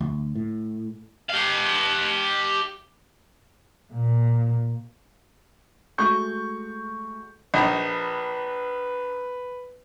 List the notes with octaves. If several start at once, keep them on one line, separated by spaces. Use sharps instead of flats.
D2
A2
G4 F5
A#2
G#3 A3 F#4 C#6 G6
A#1 D#4 B4